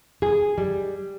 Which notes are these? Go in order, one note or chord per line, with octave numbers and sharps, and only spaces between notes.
G#4
G3